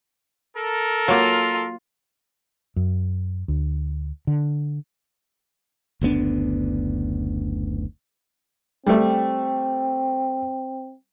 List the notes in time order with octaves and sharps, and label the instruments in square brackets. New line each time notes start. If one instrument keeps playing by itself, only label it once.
[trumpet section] A4 A#4
[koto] F#3 A#3 [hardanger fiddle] F4
[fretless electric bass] F#2
D2
D3
[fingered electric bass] F#1 D2 B3 D4
[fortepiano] G3 A3 [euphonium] C4